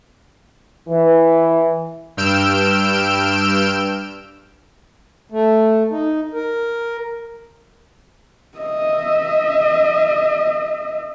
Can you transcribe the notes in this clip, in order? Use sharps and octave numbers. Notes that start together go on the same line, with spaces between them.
E3
G2 E6 F6 G6 D7 E7
A3
D#4
A#4
D#5 E5